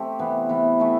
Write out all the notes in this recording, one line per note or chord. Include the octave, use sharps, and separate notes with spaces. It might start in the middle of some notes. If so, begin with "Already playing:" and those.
Already playing: A3 C4 G4
C3 E3 B3
C3 E3 B3
E3 A3 E4